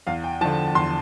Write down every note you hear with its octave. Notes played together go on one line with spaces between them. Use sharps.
E2 F5
G5
D3 F3 A5
E2 C6